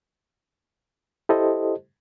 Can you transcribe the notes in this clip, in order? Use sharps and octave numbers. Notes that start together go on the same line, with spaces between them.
E4 G4 A4 C5 D#5